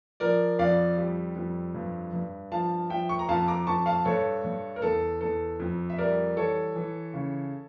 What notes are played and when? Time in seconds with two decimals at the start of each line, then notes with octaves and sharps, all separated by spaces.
0.20 F3 A#4 D5
0.59 F2 D5 F5
0.98 G3
1.36 F2
1.75 G2
2.13 G2
2.52 F3 F5 A5
2.90 F3 E5 G5
3.09 C#6
3.19 A#5
3.28 F2 F5 A5
3.48 A#5 D6
3.67 F2 A5 C#6
3.86 F5 A5
4.05 G2 A4 C#5
4.44 G2
4.76 A#4
4.82 E2 A4
5.21 E2 A4
5.60 F2
5.90 E5
5.98 G3 A#4 D5
6.37 E3 A4 C#5
6.76 E3
7.14 C#3